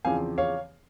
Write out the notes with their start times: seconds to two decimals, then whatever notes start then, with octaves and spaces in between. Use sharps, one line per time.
0.05 E2 C#3 F3 C4 F5 G#5
0.38 C#5 F5